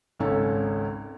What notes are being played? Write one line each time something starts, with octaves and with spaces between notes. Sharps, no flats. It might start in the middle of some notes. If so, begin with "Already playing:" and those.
G#1 C#2 C#4 A4 F5